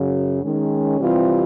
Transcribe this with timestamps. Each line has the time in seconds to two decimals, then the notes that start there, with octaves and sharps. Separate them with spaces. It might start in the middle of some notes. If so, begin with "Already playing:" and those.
Already playing: F#2 C#3 F#3
0.42 D#3 G#3 C#4
0.99 C3 E3 G3 C4 F4